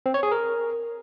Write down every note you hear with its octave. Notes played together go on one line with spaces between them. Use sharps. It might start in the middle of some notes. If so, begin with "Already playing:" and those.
C4
C#5
G#4
A#4